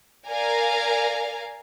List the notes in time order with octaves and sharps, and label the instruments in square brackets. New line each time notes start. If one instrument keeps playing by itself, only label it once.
[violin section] A#4 D5 F5 G#5 A#5